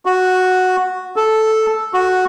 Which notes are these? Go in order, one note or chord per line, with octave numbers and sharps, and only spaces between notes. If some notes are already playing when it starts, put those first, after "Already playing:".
F#4
A4
F#4